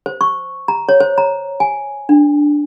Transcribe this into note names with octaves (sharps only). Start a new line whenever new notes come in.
C5
C#6
A#5
C#5
C5
A#5
G#5
D4